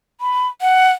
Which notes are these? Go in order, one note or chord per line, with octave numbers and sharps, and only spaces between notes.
B5
F#5